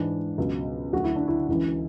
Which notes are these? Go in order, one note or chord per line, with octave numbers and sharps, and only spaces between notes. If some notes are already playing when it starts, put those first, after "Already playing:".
Already playing: G#2 E3 D4
C#2 B2 F#3
D2 D3 F#3 F#4
E4
D4
E4
C#2 C#3 E3 E4